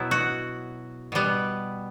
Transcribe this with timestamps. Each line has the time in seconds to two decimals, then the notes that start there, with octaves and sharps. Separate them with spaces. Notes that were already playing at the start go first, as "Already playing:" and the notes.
Already playing: B2 F#3 B3 E4
0.11 F#4
1.12 B2 G3 B3